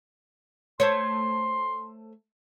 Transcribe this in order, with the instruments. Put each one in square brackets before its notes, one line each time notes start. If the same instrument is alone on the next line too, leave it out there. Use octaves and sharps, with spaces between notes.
[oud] A3 C5 C#5 [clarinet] C6